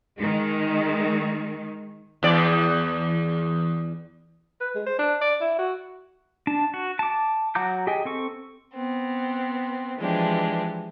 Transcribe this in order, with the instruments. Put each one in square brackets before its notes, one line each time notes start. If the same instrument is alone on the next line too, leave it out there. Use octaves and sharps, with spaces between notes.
[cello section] D#3 G#3
[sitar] E2 D5
[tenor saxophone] B4
G#3
C5
D4
D5
E4
F#4
[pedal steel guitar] D4 A5
F#4
A5 D6
F#3 F#5 A#5 D6 G6
G4 G#4 D#5 G5 G#5
C4 A4 C#6
[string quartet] B3 C4
E3 F3 G#3 D4 G4